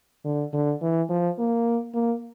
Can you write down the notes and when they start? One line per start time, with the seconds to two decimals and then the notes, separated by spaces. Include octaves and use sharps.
0.25 D3
0.53 D3
0.82 E3
1.10 F3
1.39 A#3
1.94 A#3